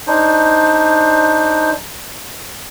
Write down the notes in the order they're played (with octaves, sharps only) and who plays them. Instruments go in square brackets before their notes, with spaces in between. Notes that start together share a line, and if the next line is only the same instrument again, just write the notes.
[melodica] D4 D#4 C5